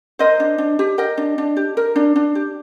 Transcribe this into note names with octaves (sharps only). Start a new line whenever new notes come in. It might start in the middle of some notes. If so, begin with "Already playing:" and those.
A#4 C5 D#5
D4
D4
G4
A#4 D#5 G5
D4
D4
G4
A#4
D4
D4
G4